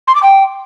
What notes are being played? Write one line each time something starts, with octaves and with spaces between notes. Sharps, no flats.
C6
D6
G5